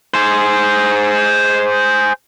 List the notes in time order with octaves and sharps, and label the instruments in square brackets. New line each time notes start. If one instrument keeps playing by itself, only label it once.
[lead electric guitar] G#4 C5